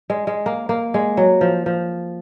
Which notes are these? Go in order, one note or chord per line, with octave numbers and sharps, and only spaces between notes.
G#3
G#3
A#3
A#3
G#3
F#3
F3
F3